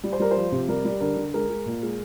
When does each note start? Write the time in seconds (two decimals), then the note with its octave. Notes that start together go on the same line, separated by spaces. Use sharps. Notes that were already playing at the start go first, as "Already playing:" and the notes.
0.04 G3
0.13 C5
0.19 G3 A#4
0.31 C5
0.36 F3
0.52 C3
0.68 G3 A#4
0.85 G3
1.01 D3 A#4
1.17 D3
1.34 G#3 A#4
1.50 G#3
1.66 A#2
1.83 G#3